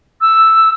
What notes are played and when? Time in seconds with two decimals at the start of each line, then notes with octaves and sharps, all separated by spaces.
0.21 E6